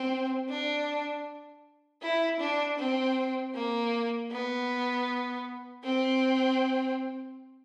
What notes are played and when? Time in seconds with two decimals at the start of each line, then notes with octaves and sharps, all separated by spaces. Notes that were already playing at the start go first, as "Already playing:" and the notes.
Already playing: C4
0.50 D4
2.02 E4
2.40 D4
2.78 C4
3.54 A#3
4.32 B3
5.84 C4